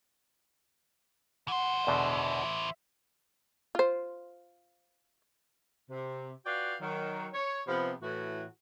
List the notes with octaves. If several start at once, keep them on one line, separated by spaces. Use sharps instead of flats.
E3 C5 F#5
E2 B2 D3 E5
F4 C5
C3
F4 F#4 B4 D5 F5 G5
D#3 F#3
C#5
C3 F3 B3
A2 E3 F#4